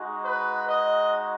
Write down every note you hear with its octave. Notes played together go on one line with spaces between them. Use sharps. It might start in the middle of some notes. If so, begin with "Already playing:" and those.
Already playing: G#3 D#4 F#4
B4
D#5